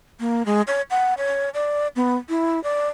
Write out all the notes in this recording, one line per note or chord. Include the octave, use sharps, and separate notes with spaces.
A#3
G#3
C#5
F#5
C#5
D5
B3
E4
D5